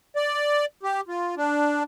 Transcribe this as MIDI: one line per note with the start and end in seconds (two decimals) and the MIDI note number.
0.16 0.65 74
0.83 1.01 67
1.08 1.35 65
1.37 1.83 62